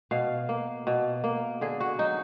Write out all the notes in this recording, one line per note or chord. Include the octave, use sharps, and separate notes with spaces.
B2 F5
A#3
B2
A#3
D3 G#4
F#4
F#3 D#4